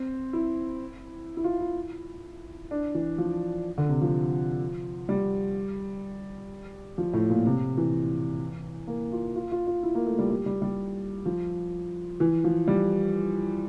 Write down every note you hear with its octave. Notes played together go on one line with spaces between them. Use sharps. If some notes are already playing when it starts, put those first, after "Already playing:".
Already playing: C4
E4
E4
F4
E4
D4
E3
F3
D3
C3
F3
G3
F3
A2
A#2
C3
E3
A#3
F4
F4
F4
F4
E4
A#3
A3
G3
G3
G3
G3
F3
E3
F3
G3